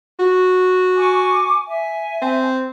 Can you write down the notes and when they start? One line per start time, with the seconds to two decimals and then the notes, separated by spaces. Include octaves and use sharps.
0.19 F#4
0.97 G#5 C#6 D6
1.67 E5 G#5
2.22 C4